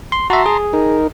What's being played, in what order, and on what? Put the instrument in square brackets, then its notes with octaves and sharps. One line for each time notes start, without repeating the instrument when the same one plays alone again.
[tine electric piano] C6
[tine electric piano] F#4 E5 [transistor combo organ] A5 A#5 C6
[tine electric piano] G#4
[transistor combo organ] D#4 A#4